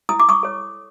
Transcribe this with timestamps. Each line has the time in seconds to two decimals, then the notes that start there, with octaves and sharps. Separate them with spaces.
0.09 E4 D#6
0.20 D6
0.29 C#6 D#6
0.43 A4 C#5